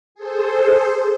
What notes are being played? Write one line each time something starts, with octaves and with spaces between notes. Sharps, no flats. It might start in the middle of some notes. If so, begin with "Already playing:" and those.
G#4 A4 C5